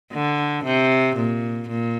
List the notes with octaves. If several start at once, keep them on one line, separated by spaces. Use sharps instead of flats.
D3
C3
A#2
A#2